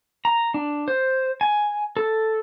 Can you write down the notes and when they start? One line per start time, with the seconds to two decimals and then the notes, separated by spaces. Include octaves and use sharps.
0.25 A#5
0.54 D4
0.88 C5
1.41 G#5
1.97 A4